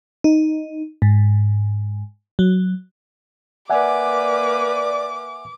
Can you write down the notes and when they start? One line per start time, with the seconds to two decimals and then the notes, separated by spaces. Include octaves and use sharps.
0.24 D#4
1.02 G#2
2.39 F#3
3.70 A#3 B4 D5 E5 F#5 G#5 D6